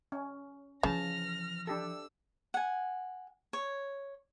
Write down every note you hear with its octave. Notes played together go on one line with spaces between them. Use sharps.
C#4
C#3 E3 F3 A5 F6 A#6
D4 G4 A4 E6
F#5 G#5
C#5